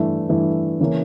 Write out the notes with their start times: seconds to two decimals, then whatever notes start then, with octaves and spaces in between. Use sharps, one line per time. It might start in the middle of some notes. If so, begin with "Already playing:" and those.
Already playing: G2 E3 A3 E4
0.29 G2 E3 A3 E4
0.80 C#3 E3 A#3 C#4